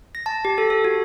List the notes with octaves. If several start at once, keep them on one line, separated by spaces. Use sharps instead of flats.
A#6
A5
G4
A4
A4
F#4